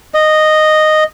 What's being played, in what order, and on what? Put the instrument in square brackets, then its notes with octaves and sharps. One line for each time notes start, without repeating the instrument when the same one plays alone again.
[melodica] D#5